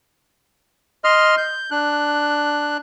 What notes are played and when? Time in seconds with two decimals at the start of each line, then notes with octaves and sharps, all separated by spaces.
1.04 D#5 C6 F6
1.38 G6
1.71 D4 F#6